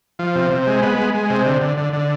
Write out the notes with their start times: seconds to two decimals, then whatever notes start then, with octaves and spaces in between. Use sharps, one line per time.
0.19 F3
0.35 C3
0.50 C3
0.67 G#3
0.82 B3
0.98 G#3
1.14 G#3
1.30 C3
1.46 D3
1.62 D3
1.77 D3
1.93 D3